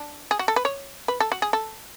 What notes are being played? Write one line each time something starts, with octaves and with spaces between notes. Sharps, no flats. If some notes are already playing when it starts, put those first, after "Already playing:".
Already playing: D4
G#4
F#4
A4
B4
C#5
B4
A4
F#4
G#4
A4